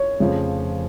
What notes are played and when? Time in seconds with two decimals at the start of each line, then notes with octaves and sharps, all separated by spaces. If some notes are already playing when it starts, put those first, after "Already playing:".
Already playing: C#5
0.19 F1 F2 C#3 F3